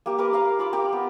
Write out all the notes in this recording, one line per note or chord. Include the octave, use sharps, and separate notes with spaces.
A#3 G4
G4 A#4 B4 D6
A#4 F5 A#5
F4 B5 D6 E6
G4 A#4 G5
B3